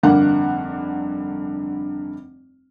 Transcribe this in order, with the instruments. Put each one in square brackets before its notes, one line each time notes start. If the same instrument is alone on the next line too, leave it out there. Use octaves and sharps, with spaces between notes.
[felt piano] F1 G2 D3 A#3 F#5